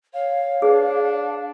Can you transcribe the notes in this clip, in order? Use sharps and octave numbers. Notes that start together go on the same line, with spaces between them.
C#5 F5
D4 G#4 B4